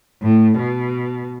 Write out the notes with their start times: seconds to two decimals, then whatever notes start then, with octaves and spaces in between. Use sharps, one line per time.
0.22 A2
0.58 B2